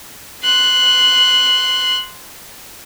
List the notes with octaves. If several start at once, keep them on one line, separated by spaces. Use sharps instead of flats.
C6 F#6